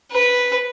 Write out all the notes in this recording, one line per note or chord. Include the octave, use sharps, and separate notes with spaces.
B4